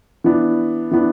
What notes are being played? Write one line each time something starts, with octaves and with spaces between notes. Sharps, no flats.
E3 B3 D4
E3 B3 D4